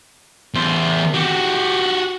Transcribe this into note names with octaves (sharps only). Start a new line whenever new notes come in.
E2 C5
F#4 G4